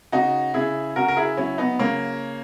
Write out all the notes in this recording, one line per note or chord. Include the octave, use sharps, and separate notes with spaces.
C#3 D#4 F#4
C#3 E4 G#4
C#3 F#4 A#4
A#4
E4 G#4
F#3 C#4 E4
B3 D#4
C#3 A#3 C#4